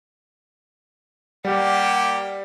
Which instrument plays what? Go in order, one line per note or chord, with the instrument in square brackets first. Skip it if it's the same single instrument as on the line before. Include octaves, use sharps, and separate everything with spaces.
[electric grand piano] G3 [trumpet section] A#3 G4 [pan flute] F#5